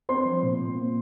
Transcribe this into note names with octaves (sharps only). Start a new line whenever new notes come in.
C4 C5 C6
F3
A#2
A#2
A#3